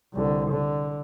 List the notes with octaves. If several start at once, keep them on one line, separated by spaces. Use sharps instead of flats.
C2 D3
D3